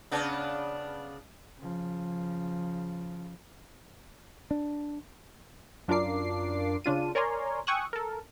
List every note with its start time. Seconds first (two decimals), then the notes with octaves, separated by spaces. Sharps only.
0.11 C#3 B3 D4
1.58 C#3 F3
4.51 D4
5.88 F#2 D4 F4 A#4 D6 C7
6.84 C#3 D4 F4 D#7
7.15 A#4 C#5 D5 G#5 A#5 C6
7.67 G5 G#5 C#6 D#6 E6 F#6
7.93 A4 A#4